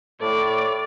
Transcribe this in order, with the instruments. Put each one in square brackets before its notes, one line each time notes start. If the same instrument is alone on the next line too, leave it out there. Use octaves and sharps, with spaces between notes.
[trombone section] A2 [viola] D5